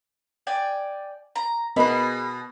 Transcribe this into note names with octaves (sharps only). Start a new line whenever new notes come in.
D5 G5 G#5
A#5
B2 B3 G#4 A#4 D#5 B5